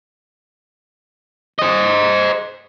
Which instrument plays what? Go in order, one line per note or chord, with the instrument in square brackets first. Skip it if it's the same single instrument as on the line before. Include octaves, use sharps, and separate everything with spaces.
[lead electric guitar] C5 D#5